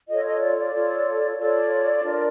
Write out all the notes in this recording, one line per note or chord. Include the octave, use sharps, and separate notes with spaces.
F4 A4 C#5 D#5
D#5
D5
D5
F4 A4 C#5
F4 A4 C#5 D5
D4 F4 A#4